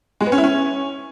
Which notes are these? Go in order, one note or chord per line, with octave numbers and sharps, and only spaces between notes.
G#3
B3
C#4
E4
C#4